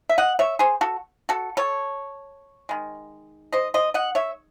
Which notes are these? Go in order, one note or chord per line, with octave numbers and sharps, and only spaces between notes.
E5
D#5 F#5
C#5 E5
G#4 C5
F#4 A4
F#4 A4
A4 C#5
D#3 G#3
C5 D#5
C5 D#5
D#5 F#5
C#5 E5